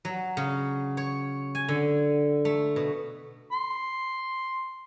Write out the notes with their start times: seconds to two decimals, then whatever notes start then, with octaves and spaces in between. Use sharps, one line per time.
0.05 F#3
0.37 C#3
0.97 C#5
1.55 G#5
1.68 D3
2.45 A3
2.76 B2
3.52 C6